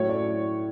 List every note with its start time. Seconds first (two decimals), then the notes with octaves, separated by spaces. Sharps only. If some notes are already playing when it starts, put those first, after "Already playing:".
Already playing: A2 F#3 C#5
0.09 D5